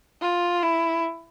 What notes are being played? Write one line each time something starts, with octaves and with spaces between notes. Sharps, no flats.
F4
E4